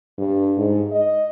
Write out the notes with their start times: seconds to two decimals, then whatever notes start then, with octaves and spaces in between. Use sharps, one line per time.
0.19 G2
0.57 G#2
0.92 D#5